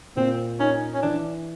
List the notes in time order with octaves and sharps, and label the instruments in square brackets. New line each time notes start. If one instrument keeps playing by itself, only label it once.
[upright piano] A#2 [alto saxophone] C4
[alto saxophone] C#4 [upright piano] D#4
[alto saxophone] C#4
[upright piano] E3 [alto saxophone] D4